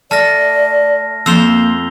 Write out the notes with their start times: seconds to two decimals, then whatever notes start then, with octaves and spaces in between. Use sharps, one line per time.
0.11 A3 D5 A5 F6 A#6
1.26 F2 A#3 C5 E6 F7 G7